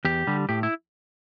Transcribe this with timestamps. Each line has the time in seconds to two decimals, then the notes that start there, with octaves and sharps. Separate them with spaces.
0.05 E2 G4
0.27 D3 G3
0.49 A2 G4
0.63 E4